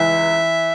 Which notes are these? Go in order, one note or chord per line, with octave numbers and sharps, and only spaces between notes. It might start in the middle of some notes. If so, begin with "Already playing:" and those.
Already playing: C#2 E3 E5